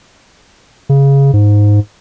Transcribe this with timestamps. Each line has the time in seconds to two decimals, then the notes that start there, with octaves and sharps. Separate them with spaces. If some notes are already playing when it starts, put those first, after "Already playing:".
0.89 C#3
1.33 G#2